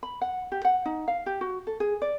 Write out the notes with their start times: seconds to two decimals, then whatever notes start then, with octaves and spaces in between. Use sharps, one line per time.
0.03 B5
0.21 F#5
0.52 G4
0.65 F#5
0.85 D#4
1.08 F5
1.26 G4
1.41 F#4
1.67 A4
1.80 G#4
2.02 D5